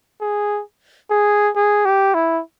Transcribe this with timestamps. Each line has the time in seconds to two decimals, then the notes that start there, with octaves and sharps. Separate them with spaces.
0.21 G#4
1.10 G#4
1.55 G#4
1.85 G4
2.15 E4